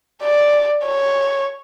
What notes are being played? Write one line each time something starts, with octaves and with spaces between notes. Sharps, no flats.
D5
C#5